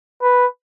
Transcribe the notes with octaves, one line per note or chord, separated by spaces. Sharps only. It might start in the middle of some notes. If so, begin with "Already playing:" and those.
B4